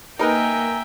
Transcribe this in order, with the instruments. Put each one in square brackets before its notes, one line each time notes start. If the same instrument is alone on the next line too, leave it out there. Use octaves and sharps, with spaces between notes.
[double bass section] A#3 [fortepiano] D#4 A#4 B4 [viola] E5 G5 [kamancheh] G#5 A#5